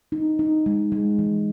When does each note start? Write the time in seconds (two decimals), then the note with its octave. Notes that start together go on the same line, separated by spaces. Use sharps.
0.12 D#4
0.39 D#4
0.66 G#3
0.92 G#3
1.19 E3